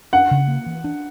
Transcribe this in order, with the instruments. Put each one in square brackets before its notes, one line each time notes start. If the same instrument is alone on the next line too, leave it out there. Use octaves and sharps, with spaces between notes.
[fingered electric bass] D4 [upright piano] F#5
[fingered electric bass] C#3
A#3
E3
D4